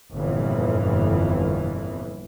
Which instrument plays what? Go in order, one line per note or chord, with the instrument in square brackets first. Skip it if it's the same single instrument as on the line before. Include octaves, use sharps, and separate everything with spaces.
[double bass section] G1 F2 A#2 E3